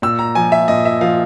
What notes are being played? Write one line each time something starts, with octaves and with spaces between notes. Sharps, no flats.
A#2 E6
A#5
F3 G#5
E5
A#2 D#5
E5
F3 F5